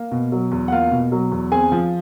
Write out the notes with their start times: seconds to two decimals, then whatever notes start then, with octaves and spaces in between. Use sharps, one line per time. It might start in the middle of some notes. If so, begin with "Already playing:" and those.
Already playing: A#3
0.11 B2
0.32 F#3
0.51 E2
0.68 F#5
0.71 A#3 F4 F5
0.91 B2
1.12 F#3
1.32 E2
1.52 C4 G#4 G#5
1.72 F3